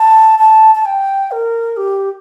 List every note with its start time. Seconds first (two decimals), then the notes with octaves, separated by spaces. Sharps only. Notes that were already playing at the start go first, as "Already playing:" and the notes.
Already playing: A5
0.39 A5
0.75 A5
0.85 G5
1.31 A#4
1.77 G4